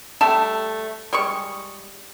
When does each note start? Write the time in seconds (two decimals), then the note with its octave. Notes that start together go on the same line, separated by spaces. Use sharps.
0.21 G3 A3 E5 A5
1.13 G3 G#3 C#6